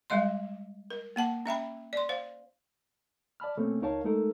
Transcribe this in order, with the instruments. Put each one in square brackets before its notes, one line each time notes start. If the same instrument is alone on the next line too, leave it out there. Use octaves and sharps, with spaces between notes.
[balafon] G3 G#3 D#5 C6
A#4
A#3 F#5 A5
C#4 E5 G5 B5
D5 C6
C5 F5
[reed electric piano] D5 A5 B5 F6
B2 A3 A#3 C4 C#4
C#2 D#4 A#4 C#5 F5 A5
G#3 A3 D#4 A4 A#4